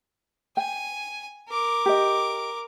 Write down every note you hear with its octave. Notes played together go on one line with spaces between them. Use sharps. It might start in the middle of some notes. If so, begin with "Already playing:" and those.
G5 G#5
A#4 D6
G4 D#5